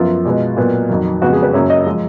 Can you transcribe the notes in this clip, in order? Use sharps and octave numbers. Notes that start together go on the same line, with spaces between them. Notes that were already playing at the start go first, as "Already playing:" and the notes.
Already playing: F#2 F3 B3 F4
B2 G#3 B3
A#2 F#3 B3
F2 D#3 F#3
F2 C#3 G#3 B3 F#4
G#4
B4
F#2 C#3 F#3 A#3 C#5
D#5
F3 G#3